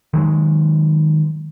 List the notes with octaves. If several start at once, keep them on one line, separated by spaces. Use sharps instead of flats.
D#3 F#3 G#3